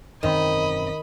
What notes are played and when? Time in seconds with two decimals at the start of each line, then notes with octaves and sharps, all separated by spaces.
0.23 E1 F#2 D#3 C4 D#5 B5